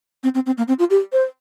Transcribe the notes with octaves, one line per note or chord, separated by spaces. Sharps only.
C4
C4
C4
A#3
C4
F4
G4
C5